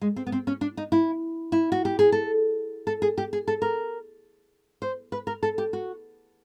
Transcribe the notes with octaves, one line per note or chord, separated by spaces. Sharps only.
G#3
C4
B3
C4
C#4
D4
D#4
E4
E4
F#4
G4
G#4
A4
A4
G#4
G4
G#4
A4
A#4
C5
B4
A#4
A4
G4
F#4